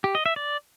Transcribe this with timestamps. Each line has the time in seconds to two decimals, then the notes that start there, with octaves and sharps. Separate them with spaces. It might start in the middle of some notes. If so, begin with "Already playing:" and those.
0.04 G4
0.15 D#5
0.26 E5
0.36 D5